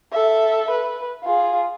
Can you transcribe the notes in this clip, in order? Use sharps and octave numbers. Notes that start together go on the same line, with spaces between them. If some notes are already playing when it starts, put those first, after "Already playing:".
A4 E5
B4
F4 G#4